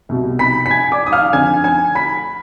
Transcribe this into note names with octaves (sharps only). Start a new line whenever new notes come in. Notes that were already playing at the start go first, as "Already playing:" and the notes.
C2 B2
B5 B6
B6
G#5 G#6
D5 D6
D#6
F5 F6
F2 D3 G#5 G#6
G#5 G#6
B5 B6